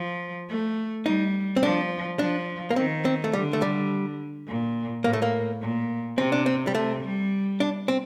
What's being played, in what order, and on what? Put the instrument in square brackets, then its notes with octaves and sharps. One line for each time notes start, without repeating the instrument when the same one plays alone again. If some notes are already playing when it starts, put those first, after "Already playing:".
Already playing: [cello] F3
A3
[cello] G3 [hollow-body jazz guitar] D#4
[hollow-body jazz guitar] C4
[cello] F3 [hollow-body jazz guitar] D4
[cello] F3 [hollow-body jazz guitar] D4
[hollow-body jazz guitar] A#3
[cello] D#3 [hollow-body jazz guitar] C4
[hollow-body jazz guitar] C4
A3
[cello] D3 [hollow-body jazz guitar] G3
[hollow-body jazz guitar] A3
G3
[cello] A#2
[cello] A2 [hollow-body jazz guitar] A#3
[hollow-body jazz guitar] A3
A#3
[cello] A#2
[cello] C3 [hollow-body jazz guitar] C4
[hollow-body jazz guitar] D4
C4
G3
[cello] C3 [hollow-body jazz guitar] A3
[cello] G3
[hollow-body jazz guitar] D4
C4